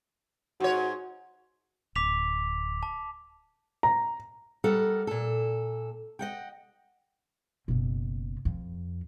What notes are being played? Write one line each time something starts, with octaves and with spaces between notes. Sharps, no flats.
G#2 F#4 C#5
D1 D6 B6 F7
A5
A#5
G3 A4 A#4 F#5
A#2 A4
D#5 F#5 G5
F#1 B2
F2